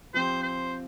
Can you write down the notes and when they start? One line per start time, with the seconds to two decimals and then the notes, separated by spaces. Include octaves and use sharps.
0.14 F3 C4 G4 C5
0.43 C5